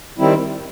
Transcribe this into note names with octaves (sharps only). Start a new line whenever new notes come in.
D#3 G3 C4 E4